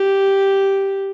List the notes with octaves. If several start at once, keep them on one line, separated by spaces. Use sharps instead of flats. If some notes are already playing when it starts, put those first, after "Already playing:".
Already playing: G4